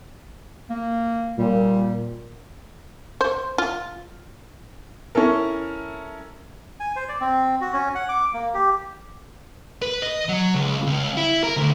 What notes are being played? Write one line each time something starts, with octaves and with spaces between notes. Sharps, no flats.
A#3
A#2 G3
C5
F4
C#4 E4 A4 A#4
G#5
C5
D5
C4
F#4
C#4
F#5
D6
A#3
G4
B4
D#5
F#3
C#2
C#2
E4
A#4
D2